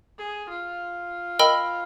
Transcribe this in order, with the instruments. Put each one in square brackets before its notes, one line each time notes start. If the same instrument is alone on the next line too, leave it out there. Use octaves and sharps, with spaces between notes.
[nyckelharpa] G#4
F4
[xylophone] A#4 D#5 G5 B5 E6